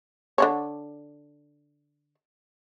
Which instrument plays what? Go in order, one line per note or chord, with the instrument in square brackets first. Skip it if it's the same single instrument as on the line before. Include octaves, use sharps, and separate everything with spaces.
[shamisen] D3 D4 C#5